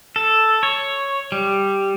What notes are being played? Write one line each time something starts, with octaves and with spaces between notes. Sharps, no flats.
A4
C#5
G3